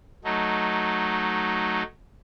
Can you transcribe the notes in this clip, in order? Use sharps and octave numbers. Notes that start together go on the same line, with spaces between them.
F#3 A3 D#4